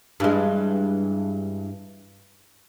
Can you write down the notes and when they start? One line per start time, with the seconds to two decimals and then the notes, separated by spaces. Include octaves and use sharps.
0.20 G2 E3 G#3